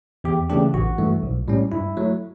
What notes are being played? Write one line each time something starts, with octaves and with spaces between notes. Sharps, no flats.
E2 G4
C#3 E3 A3 D4 G4
A1 F#4
G2 E3 A3
B1
A2 G3 C#4
G2 E4
F#3 A3